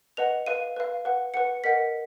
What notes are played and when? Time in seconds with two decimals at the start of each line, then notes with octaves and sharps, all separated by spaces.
0.17 B4 D#5 F#5 F7
0.46 B4 F5 D#7
0.76 B4 F5
1.05 B4 F#5
1.34 B4 F#5 C#7
1.64 A#4 D#5 F#5 B6